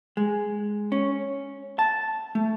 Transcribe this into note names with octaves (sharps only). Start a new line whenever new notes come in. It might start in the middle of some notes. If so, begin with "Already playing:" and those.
G#3
C#4
A5
A3